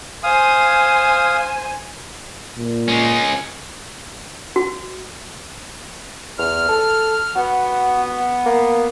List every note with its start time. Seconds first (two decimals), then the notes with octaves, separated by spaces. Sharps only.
0.23 C5 F5 G#5 D#6
2.57 A#2
2.88 G#3 C#4
4.56 F#4
6.39 E2 F6
6.69 A4
7.36 B3 F#4
8.46 A#3